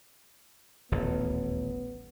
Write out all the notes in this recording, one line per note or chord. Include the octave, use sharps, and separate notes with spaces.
D#1 A1 D2 B3